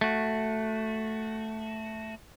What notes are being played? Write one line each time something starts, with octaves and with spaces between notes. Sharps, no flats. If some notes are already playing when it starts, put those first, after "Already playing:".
A3 F#4